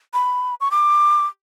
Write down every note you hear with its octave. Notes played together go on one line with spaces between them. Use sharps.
B5
C#6
D6